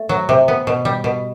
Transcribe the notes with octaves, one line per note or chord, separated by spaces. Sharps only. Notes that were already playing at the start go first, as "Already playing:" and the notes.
Already playing: A3
F#3
C3
B3
B2
G3
B2